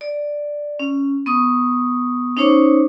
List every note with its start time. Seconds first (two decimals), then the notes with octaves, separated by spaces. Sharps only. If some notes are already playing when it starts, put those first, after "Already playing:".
0.01 D5
0.79 C#4
1.26 B3 C#6 D#6
2.37 C#4 D#4 C5 C#5 C#6 D6